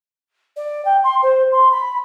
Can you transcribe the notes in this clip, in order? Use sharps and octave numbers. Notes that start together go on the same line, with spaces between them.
D5
G5
C6
C5
C6
B5